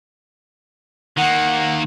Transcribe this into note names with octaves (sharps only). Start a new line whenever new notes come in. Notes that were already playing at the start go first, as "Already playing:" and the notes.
D#3 A#3 F#5